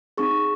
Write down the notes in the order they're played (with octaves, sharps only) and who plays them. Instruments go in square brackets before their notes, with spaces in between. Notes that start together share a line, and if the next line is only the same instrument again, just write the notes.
[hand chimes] C4 D#4 G#4 C#6